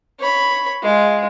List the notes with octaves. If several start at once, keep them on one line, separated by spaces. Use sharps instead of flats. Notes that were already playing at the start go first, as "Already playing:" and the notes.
C#5 B5
G#3 F4